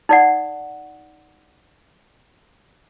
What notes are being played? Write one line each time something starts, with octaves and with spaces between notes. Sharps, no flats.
D#4 D5 F#5